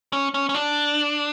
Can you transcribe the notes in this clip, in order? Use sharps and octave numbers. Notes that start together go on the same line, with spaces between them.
C#4
C#4
C#4
D4